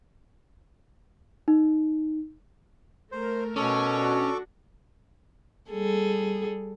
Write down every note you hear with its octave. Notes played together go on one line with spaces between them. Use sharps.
D#4
A3 A#4 C5
B2 C#4 A4 C#6 D6
D4 F#4
G3 G#4 A4